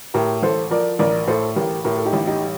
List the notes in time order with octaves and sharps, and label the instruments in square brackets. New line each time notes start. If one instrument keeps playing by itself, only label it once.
[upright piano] A2 G4 A#4
A1 A4 C5
F3 A#4 D5
A1 A#4 D5
A2 A4 C5
A1 G4 A#4
A2 G4 A#4
A4
D#4 G4
A1
D#4 G4
G3